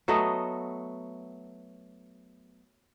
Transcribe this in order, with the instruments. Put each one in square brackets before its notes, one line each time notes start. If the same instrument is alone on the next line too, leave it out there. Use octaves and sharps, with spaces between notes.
[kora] F#3 A3 B3 D#5